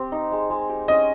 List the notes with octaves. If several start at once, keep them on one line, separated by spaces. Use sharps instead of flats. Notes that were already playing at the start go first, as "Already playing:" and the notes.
Already playing: C4 G4
D#4
G#3
G#3
G4
C#4 D#5